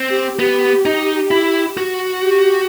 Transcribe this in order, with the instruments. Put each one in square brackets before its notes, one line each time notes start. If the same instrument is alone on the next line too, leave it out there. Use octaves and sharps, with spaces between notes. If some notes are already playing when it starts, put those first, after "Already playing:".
Already playing: [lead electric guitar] C4
[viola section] G4
[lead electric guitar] B3 [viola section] G4
[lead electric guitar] D#4
E4
F#4
[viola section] G4